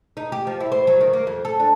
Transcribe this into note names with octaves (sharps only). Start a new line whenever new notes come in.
D#4
G4
F3
E4
C5
F#3
D#3
A#3
F2
A4
D4